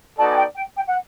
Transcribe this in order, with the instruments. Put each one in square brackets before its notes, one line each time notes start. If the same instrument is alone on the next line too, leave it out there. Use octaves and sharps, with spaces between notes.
[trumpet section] B3 D#4 F#4 A4 D5 [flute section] A5
[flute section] G#5
G5
G5
G5
F#5